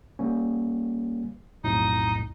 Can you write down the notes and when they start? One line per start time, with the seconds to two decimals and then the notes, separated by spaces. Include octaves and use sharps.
0.19 G3 A#3 C#4
1.64 B1 F2 A2 D#4